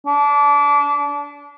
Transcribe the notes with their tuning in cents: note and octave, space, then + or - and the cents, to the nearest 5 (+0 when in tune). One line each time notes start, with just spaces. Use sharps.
D4 -25